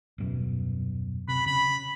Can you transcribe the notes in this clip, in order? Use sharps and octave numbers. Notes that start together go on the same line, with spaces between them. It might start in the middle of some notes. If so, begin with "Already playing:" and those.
D#1 F#2 B2
C3 B5
C#3 B5